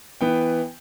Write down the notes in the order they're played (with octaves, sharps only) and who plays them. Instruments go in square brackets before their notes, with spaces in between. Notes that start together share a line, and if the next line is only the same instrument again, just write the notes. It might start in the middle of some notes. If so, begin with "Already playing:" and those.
[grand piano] E3 B3 G5